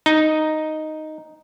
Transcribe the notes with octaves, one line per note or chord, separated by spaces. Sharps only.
D#4